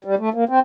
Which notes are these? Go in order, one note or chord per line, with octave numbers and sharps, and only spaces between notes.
G3
A3
A#3
C4